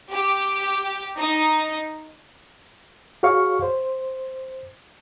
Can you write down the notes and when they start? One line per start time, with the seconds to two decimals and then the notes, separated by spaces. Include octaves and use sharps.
0.11 G4
1.19 D#4
3.23 F#4 G#4 C#5 F5 C#6
3.62 C5